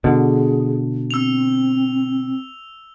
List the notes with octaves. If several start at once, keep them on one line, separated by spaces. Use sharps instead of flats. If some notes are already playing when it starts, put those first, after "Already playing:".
B2 D3 G#4
C4 E6 F7